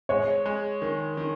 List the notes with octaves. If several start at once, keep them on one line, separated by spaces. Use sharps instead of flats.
G#3 C#5
G#3
D#3
D#3